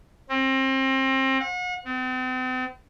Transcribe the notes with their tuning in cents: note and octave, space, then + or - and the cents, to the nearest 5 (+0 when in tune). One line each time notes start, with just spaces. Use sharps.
C4 +30
F#5 -35
C4 -40